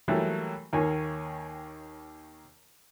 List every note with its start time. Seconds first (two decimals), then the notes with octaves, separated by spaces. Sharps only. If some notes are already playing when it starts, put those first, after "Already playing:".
0.08 E3 F#3 G3 A3 A#3
0.73 D#2 D#3 A#3 C#5 G#5